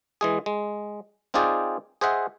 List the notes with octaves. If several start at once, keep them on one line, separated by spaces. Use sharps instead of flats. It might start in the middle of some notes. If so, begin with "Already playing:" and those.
E3 G#3 G#4
G#3
C4 D#4 F4 G#4 D5 G5
G#4 C5 D#5 E5 F#5